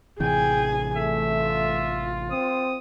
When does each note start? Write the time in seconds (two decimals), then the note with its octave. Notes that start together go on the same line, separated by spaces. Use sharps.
0.20 A1 C3 E3 G#4 G5 G#5
0.96 A3 E5
1.42 F4
2.31 C4 D#6